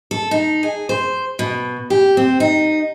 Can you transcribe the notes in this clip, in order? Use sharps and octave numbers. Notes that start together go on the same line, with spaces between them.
A4
D#4
G#4
C5
B2
G4
C4
D#4